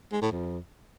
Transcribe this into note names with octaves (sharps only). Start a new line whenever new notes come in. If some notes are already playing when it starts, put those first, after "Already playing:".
G#3
A2
F2